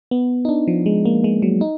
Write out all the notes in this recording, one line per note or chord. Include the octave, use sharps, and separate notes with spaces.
B3
D#4
D4
F3
G#3
A#3
G#3
F#3
D#4